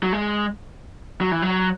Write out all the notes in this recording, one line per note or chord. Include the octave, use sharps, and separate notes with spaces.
F#3
G#3
F#3
E3
F#3